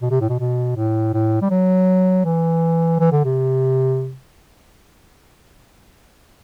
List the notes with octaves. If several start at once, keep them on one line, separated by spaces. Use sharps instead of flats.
B2
C3
A2
B2
B2
A2
A2
G3
F#3
E3
E3
D3
C3